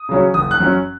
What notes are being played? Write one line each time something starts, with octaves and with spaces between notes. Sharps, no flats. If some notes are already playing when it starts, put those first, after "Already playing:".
Already playing: D#6
C#3 F#3 C#4
F#1 D#6
F#6
F#2 F#3 C#4